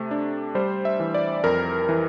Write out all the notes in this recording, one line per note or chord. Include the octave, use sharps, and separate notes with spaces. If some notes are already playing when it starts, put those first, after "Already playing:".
Already playing: C3 A3
D4
G3 C5
E5
E3
D5
F2 A#4
E3